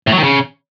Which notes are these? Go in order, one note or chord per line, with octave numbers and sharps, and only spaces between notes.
A2
F#3
D#3
C#3